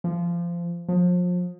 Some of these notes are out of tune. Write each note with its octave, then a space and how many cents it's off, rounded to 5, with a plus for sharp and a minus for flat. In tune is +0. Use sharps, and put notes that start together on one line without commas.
F3 -20
F3 +35